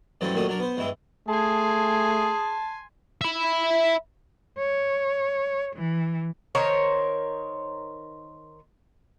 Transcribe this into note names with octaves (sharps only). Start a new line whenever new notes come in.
G2 E3 F#3 A3 C4 C#4
D#2 A#2 F#3 A3 D4 D#6
F#3 D4 A#4
B3 C5
G2 E3 G#3 E4
A3 G#4 G#5 A5 C6
E5 B5
C#5
E3
D#3 A#4 C5 C#5